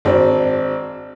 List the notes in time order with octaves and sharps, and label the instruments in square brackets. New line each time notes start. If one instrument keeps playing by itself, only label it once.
[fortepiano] G#1 C4 D4 F#4